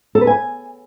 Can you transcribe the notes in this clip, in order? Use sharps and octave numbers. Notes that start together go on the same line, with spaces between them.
A4
B4
G#5